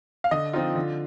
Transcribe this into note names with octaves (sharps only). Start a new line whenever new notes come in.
F5
D3 D#5
F3 C4 D#4 F4
D3